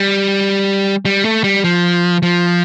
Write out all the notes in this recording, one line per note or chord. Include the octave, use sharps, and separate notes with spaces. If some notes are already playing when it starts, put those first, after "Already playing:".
Already playing: G3
G3
A3
G3
F3
F3